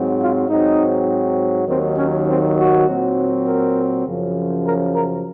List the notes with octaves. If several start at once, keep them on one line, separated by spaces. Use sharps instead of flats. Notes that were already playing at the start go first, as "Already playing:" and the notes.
Already playing: G#2 F#3 C4
F4
G#2 F#3 C4 D#4
D#2 D#3 F#3 C4
C#4
C4
F#4
A#2 F#3 C4
A#4
F#2 C#3 F3
A#4
A#4